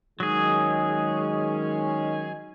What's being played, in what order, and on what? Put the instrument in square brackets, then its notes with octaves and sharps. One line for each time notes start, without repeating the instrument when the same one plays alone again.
[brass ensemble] D#3 G#3 C#4 [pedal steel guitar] F#3 G#4